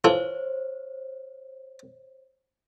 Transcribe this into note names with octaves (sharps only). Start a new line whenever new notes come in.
E3 F4 A4 C5 C#5